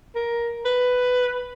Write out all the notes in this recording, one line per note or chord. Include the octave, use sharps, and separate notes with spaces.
A#4
B4